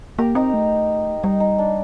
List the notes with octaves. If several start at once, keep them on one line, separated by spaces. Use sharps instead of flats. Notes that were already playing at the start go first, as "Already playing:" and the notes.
A#3 G4 A#4
C4 D#4 G4
A3
G3 D#4
D#4
D4